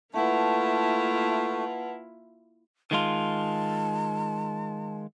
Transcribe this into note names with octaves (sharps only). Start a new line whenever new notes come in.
A3 A#3 E4 F4 B4 F#5 A5
D#3 G#3 F4 A5